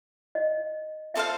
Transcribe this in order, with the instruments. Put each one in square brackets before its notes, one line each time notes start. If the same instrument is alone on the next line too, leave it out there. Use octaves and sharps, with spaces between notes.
[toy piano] D#5
[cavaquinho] F4 A4 C5 F5 [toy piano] E5